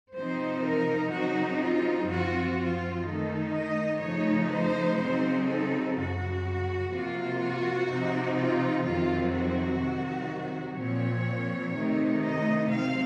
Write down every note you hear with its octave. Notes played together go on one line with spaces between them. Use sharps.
C3 F3 C4 D#4 C5
A#4
C#3 F#3 C4 D#4 F#4
F4
F#2 F3 C4 F4 F#4
F4
D#3 A3 D#4 A4
D#5
C#3 F3 A3 D#4 C#5
C5
C#3 F#3 C4 D#4 C5
A4
F#2 C#3 F#3 F#4
C3 F3 A#3 F4
F#4
C3 F3 C4 D#4
F4
F2 C3 D#3 F#3 C4 F4
F#4
C3 D#3 F#3
A#2 F3 C4 C#5
C3 D#3 A3 D#4
D#5
C3 F#3 C4 F5